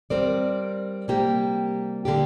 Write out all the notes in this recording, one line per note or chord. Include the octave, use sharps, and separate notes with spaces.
G3 C4 A#4 D5
C3 G3 A#3 G4
D3 A#3 D4 G4